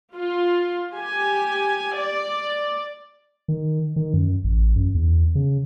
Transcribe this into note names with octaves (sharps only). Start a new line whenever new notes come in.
F4
G4 G#5
D5
D#3
D#3
F#2
A1
F#2
E2
C#3